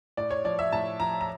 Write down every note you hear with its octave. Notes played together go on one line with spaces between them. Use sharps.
A2 D5
C#5
F3 D5
E5
A2 A5
F3 A#5
A#5